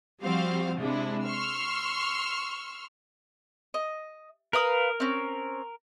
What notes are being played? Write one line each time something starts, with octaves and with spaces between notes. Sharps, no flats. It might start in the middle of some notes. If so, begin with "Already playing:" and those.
F3 G3 C4 F#4 C5 F5
C3 G#3 D4 E4
C6 C#6 E6 F6
D#5
A#4 B4 F5 D#6
C4 C#4